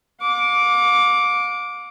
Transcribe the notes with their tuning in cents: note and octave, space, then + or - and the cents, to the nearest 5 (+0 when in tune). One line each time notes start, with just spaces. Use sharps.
F5 +45 D6 -5